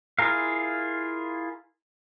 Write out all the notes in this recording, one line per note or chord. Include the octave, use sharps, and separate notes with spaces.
E4 F4 G#4 A#4 F5